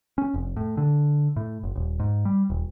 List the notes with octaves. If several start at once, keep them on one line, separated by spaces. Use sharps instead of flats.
C#4
F1
A2
D3
A2
F#1
D#1
G#2
G3
D#1